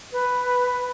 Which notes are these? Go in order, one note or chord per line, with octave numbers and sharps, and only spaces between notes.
B4